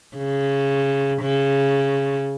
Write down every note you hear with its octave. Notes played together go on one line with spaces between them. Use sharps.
C#3
C#3